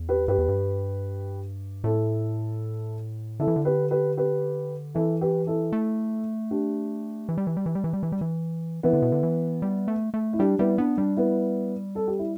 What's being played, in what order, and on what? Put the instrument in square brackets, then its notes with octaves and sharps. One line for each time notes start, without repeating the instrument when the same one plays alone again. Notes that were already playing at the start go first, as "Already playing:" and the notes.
Already playing: [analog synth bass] E2
[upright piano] G4 B4
[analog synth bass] G2 [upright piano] G4 B4
[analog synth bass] E2
G2
[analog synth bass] A2 [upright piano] E4 A4
[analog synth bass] D3 [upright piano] E4 A4
[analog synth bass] E3
D3
[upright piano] G4 B4
G4 B4
G4 B4
[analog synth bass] E3 [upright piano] E4 A4
[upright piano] G4 B4
E4 A4
[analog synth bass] A3
[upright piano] D4 G4
[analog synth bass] E3
G3
E3
G3
E3
G3
E3
G3
E3
G3
E3
[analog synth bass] E3 [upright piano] B3 E4
[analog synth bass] D3
B2
D3
E3
G3
A3
A3
[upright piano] E4
[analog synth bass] G3 [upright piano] D4 G4
[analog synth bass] G3 [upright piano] B3 E4
[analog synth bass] B3 [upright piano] D4
[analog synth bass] G3 [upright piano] D4
[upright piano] B3 E4
A4
G4
E4